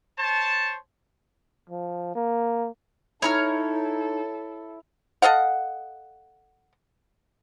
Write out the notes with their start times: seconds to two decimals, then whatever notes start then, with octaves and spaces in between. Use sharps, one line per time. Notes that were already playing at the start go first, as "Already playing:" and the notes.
0.19 C5 C#5 A5
1.70 F3
2.15 A#3
3.22 D#4 E4 A4 C#5 A#5 F6
5.22 A4 D#5 F5 F#5